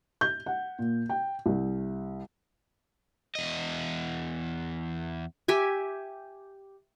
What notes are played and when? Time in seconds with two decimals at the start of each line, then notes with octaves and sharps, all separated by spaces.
0.21 G6
0.46 F#5
0.79 A#2
1.09 G5
1.46 C2
3.35 E2 D#5
5.48 G4 E5 G#5